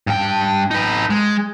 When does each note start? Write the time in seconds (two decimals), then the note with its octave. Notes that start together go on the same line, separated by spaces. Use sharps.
0.07 G2 G5
0.71 D#4 B4
1.10 G#3